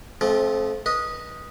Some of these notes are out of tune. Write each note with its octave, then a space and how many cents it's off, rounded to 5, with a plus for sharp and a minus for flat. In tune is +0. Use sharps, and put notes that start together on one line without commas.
F3 +0 A3 -35 C4 +20
B4 -30 D#5 +0